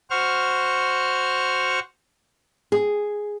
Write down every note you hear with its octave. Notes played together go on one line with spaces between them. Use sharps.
F#4 C5 C#6 F6
G#4